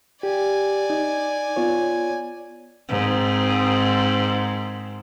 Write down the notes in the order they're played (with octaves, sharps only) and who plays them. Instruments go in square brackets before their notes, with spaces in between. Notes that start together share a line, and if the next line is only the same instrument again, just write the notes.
[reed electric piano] G4 [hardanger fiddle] D5 G#5
[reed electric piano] D#4
B3 F4 C#5
[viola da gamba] G#2 D#3 C4